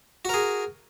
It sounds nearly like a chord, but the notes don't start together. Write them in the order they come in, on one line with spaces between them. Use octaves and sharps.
F#4 A#4 G#4